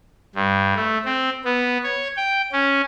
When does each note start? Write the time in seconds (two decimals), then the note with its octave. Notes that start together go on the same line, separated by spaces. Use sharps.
0.35 G2
0.75 A3
1.05 C4
1.44 B3
1.83 C#5
2.17 G5
2.52 C#4